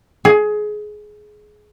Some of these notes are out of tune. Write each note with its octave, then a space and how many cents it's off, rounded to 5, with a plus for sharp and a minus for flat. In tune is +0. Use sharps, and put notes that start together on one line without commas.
G#4 +20